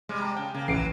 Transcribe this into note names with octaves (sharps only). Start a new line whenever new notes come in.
C3 G3 G#3
A5 A#5
C#3 G5
C#3 A#3
A1 E3 F#3 C7 D7